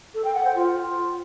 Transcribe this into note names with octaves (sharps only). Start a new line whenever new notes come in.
A4
G5
F#5
C5
F4